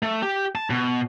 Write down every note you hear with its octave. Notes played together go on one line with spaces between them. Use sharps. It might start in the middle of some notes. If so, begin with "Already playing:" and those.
A3
G4
A5
B2